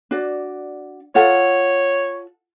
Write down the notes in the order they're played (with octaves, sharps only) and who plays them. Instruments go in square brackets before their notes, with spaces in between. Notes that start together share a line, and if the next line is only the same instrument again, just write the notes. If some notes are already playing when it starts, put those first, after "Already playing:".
[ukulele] D4 F#4 D5
[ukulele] F4 A4 F#5 [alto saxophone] C#5